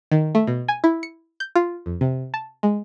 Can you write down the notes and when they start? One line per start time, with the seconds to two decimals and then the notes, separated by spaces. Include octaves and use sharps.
0.12 D#3
0.35 A3
0.47 B2
0.68 G#5
0.84 E4
1.03 C#7
1.40 G6
1.56 F4
1.86 F2
2.01 C3
2.34 A5
2.63 G#3